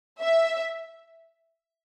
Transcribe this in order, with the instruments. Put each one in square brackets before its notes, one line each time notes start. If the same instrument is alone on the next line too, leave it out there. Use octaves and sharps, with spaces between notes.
[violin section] E5